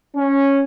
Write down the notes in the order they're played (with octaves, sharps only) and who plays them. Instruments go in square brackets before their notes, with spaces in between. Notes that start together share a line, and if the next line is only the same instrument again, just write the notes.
[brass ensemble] C#4